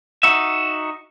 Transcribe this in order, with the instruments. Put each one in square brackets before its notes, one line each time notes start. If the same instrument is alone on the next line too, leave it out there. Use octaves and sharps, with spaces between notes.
[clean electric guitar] D#4 F#4 E5